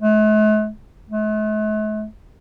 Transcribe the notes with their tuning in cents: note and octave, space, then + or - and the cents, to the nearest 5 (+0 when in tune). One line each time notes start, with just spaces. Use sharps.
A3 -45
A3 -45